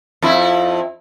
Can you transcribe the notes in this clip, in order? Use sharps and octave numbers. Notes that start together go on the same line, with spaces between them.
F2 E4